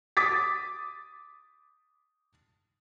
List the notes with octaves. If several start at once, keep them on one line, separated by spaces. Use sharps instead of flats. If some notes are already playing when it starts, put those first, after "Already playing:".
D6 D#6 A6 B6